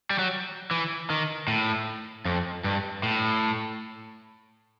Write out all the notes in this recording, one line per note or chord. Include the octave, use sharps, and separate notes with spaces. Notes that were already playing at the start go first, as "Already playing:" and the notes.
G3
F#3
E3
D#3
A2
F2
G2
A2